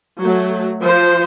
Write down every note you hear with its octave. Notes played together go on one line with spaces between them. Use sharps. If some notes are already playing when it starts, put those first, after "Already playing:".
F#3 A3
F3 C5